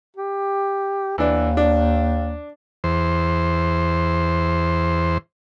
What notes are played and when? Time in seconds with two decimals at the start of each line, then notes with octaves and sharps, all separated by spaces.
0.16 G4
1.18 D#2 E3 D4
1.57 D4
2.84 E2 C5